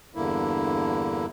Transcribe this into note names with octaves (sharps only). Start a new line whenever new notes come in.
E2 G2 D3 A#3 E4